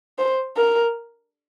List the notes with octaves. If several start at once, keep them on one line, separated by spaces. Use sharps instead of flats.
C5
A#4